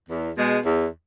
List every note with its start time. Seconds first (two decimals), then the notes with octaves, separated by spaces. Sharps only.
0.09 E2
0.37 B2 G#3
0.64 E2